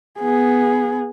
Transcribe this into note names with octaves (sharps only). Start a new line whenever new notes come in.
B3 G#4